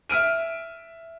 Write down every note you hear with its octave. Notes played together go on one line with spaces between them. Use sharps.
E5 F6 D7 D#7